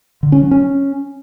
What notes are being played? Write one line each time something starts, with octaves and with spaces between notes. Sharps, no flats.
D3
C#4
F#3
C#4